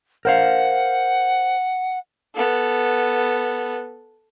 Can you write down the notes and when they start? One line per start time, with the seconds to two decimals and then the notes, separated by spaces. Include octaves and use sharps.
0.25 A#4 C5 F5 F#5
2.35 B3 A4